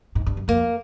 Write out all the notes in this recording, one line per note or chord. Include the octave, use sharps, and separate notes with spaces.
G#2
G2
F#2
F2 A#3